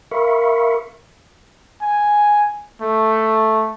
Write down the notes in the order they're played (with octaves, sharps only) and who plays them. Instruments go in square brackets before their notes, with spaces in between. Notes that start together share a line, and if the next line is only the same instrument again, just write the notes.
[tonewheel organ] A#4 E5 F5 B5 C#6
[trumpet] G#5
A3